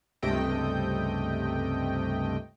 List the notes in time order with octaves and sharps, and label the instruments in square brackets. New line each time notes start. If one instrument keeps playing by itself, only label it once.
[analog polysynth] C#2 G2 C3 A3 D#5 G5